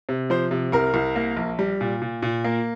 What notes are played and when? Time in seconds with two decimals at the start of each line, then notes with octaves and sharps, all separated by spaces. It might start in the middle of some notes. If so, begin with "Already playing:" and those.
0.09 C3
0.30 F3 C5
0.51 C3
0.72 C2 A#4
0.94 C2
1.16 A#3
1.37 A#1
1.59 G3
1.81 A#2
2.02 A#2
2.23 A#2
2.45 A#3